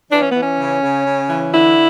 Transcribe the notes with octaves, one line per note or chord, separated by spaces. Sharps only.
E3 D4
C#4
E3 B3
C#4
C#3
C#3
C#3
E3
D3 E4